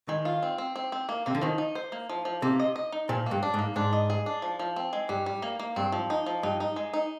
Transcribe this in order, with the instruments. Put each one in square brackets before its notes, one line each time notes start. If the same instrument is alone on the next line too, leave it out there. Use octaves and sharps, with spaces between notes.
[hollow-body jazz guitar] D#3 [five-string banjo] G#3
[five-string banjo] F4
C4
C4
C4
C4
A#3
[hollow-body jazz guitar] C3 [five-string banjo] A#3
[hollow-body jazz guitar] D3
[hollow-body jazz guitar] D#3 [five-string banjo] F3
[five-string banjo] D#4
C5
A#3
F3
F3
[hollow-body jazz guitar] C3 [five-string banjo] A#3
[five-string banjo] D#5
D#5
D#4
[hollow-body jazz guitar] A#2 [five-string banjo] F3
[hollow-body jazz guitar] G2 [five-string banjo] A#3
[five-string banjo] D4
[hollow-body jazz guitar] G#2
[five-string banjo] A#3
[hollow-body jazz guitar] G#2 [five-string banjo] D4
[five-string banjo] D#5
G#4
D4
F3
F3
C4
G#3
[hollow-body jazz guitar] G2 [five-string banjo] G3
[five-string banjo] G3
A#3
A#3
[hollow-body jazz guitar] G2 [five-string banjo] C4
[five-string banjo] F3
D#4
F3
[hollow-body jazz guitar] G2 [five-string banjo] D#4
[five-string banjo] D#4
G#3
D#4